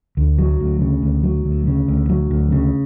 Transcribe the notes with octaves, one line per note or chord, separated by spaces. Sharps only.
D2
F#3
D2
C#3
D2
F#3
D2
C#3
D2
F#3
D2
C#3